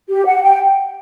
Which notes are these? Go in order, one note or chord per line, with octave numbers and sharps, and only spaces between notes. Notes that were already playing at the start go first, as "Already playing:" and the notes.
G4
F#5
G5